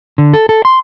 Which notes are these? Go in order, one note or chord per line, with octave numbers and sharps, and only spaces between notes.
D3
A4
A4
C6